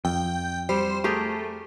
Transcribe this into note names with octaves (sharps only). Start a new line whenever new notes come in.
F2 G5
G3 C5
A3 G4 G#4 A#4